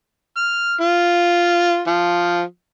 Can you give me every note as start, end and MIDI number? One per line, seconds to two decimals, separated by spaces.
0.37 0.74 89
0.81 1.81 65
1.88 2.43 53